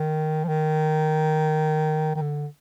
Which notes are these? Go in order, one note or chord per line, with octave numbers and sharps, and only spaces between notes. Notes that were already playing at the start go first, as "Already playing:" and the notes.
Already playing: D#3
F3
D#3
D#3
D3